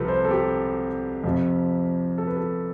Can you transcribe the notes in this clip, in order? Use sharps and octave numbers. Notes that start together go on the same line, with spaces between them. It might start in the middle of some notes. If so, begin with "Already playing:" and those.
Already playing: C2 C3 F3 C4 A4 B4
C5
A4
G4
F2 C3 F3
A4
B4
A4